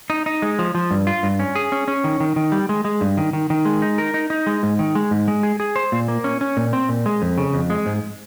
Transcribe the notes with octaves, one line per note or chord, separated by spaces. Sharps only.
D#4
D#4
G#3
F3
F3
G2
F4
G2
C#4
G#4
C#4
C#4
D#3
D#3
D#3
G3
G#3
G#3
G2
D#3
D#3
D#3
G#3
D#4
A#4
D#4
D#4
G#3
G#2
D#3
G#3
G#2
G#3
G#4
G#4
C5
A#2
A#3
C#4
C#4
A#2
C4
A#2
G#3
F2
C#3
F2
G#3
G#2